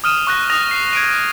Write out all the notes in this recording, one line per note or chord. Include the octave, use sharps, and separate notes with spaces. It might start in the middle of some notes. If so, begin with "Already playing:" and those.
D#6 F6 D#7 E7
C#6 F#6 A#6
D#6 A#6 F7
C7
G#6 D7 D#7